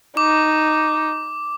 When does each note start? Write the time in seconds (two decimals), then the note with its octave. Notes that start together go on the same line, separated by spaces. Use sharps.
0.17 D#4 D6